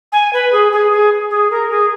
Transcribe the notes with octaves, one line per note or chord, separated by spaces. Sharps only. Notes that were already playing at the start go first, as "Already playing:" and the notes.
G#5
B4
G#4
G#4
G#4
G#4
A#4
G#4